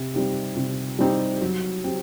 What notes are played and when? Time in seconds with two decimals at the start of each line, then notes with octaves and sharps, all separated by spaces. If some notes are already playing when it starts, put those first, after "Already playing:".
Already playing: C3
0.14 G3 C4 D#4 G4
0.56 C3
0.99 G3 C4 D#4 G4
1.41 F#3
1.84 C4 G4